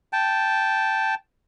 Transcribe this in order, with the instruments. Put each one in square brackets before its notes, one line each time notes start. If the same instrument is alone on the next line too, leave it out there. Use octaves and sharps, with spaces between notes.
[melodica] G5 A5